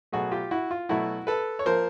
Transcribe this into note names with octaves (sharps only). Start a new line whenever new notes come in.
B2 F#3 A3 F#4 G#4
F4 G4
E4 F#4
F4
B2 F#3 A3 E4 F#4
A4 B4
C#5
F3 A#3 A#4 C5